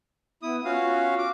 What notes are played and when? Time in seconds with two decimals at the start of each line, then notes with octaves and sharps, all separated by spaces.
0.42 B3 E4 D#6
0.65 C#4 F4 F#4 F5
1.19 D6